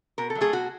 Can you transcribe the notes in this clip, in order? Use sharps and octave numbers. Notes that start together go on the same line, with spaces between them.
B2 A#4
A4
F#3
A3 G#4
B2 F#4